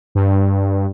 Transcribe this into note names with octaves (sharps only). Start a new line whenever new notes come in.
G2